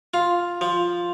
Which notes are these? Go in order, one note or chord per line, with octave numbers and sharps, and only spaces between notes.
F4
F3